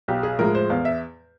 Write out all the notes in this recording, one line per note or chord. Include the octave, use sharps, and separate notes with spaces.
B1 G4
G#4
A2 F3 G#3 A#4
C5
E2 F5
E5